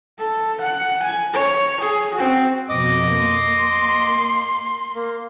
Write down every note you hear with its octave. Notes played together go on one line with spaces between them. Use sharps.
A4
F#5
G#5
C#5
G#4
C4 F#4
F2 B2 D#5 D6
A#3 C6
A#3